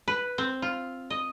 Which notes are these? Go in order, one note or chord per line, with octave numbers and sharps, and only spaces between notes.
B4
C4
F4
D#5